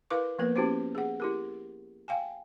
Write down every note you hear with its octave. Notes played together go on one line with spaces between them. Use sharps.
E4 A#4 B4 F5 C#6 D6
F3 A#3 B3 A#4 B4
B3 C#4 E4 F#4 G4 C5
G#4 F#5
E4 G4 A#4
F5 G5 G#5